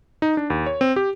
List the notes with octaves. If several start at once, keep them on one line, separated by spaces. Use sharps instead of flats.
D#4
D4
D#2
C#5
C4
G4